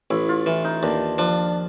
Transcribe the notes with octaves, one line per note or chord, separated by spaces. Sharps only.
A1 E4
F4
E3
D#4
D#2 D4
F3 D4